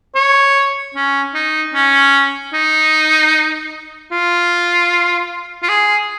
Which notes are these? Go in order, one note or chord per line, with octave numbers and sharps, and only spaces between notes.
C#5
C#4
D#4
C#4
D#4
F4
F4
G#4